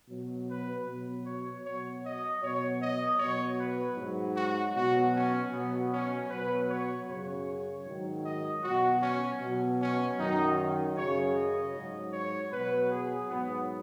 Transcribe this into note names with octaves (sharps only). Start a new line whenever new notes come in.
B2 F#3
B4
B2 F#3
C#5
B2 F#3 C#5
D#5
B2 F#3 C#5
D#5
B2 F#3 C#5
B4
G#2 F#3
F#4
B2 F#3 F#4
C#4
B2 F#3 B3
C#4
B2 F#3 B4
C#5
F#2 C#3 F#3 C#5
G#2 D#3 F#3
D#5
B2 F#3 F#4
C#4
B2 F#3
C#4
F#2 D#3 F#3 D#4
F#2 C#3 F#3 C#5
D#5
G#2 F#3
C#5
B2 F#3 B4
G#4
G#2 F#3 B3